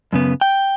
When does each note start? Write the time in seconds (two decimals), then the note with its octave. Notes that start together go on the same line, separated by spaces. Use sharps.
0.13 F#2 C#3 B3
0.41 G5